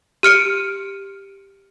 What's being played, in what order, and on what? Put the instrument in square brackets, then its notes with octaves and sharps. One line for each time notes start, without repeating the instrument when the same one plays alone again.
[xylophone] G4 F6 C#7 D7